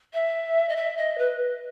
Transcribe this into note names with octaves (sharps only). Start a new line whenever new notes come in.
E5
D#5
E5
D#5
B4